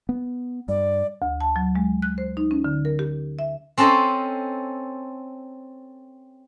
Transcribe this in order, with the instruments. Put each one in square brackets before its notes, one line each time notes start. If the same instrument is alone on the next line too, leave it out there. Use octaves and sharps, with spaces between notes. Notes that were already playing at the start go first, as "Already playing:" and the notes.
[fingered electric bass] B3
[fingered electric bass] G2 [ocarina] D5
[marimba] D2
A5
F#3
G#3
F#6
C5
D#4
C#4
D3
A#4
G4
E5
[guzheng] C4 C#4 A4 C5 D#5